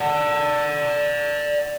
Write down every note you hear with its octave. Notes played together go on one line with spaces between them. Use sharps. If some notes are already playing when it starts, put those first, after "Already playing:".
D5 F#5